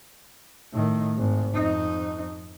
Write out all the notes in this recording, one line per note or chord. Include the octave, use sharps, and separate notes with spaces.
A2 D#3
G#1
F2 D#4